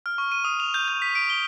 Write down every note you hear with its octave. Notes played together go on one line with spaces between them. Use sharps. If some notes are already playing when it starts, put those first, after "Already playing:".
F6
C#6
D#7
D#6
F7
G6
G6
B6
D7
G7